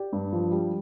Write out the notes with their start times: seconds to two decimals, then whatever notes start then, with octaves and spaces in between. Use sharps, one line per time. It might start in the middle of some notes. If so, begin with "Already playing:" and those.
Already playing: G4 D5
0.13 G2
0.33 F3
0.51 G3